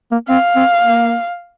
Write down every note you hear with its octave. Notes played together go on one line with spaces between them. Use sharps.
A#3
C4 F5
C4
A#3